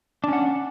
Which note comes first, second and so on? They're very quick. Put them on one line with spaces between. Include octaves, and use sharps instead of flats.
D4 C#4 F#5